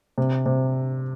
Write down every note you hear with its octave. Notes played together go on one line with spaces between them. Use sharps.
C3
C3